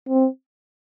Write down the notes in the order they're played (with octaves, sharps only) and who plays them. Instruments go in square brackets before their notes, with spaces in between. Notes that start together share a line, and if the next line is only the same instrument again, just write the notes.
[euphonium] C4